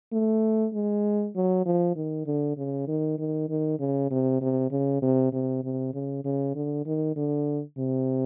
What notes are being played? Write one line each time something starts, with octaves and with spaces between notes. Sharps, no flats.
A3
G#3
F#3
F3
D#3
D3
C#3
D#3
D#3
D#3
C#3
C3
C3
C#3
C3
C3
C3
C#3
C#3
D3
D#3
D3
C3